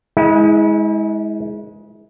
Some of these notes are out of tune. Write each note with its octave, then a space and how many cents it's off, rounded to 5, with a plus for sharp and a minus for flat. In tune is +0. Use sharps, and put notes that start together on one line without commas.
G#3 +10 E4 -35